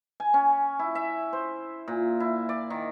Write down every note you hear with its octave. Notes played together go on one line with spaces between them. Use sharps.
G#5
C#4
E4
E5
C5
A#2
E4
D5
D#3